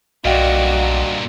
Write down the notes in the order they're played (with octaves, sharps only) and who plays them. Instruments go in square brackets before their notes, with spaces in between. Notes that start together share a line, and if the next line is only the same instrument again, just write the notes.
[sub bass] B1 [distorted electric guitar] G2 A#2 [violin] F#4 D5 [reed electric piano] D#5 F5 G5